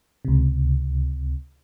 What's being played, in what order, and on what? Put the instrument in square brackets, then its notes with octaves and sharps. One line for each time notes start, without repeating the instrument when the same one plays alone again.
[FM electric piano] C#2 C3